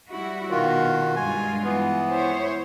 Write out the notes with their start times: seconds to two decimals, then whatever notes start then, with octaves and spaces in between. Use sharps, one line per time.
0.10 G3 E4 F#4
0.50 B2 D#3 F4 F#4
1.16 G2 G#3 F4 G#5
1.64 E3 B3
2.10 E4 C5 C#5